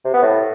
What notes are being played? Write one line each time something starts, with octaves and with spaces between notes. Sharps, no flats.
C3
B3
A2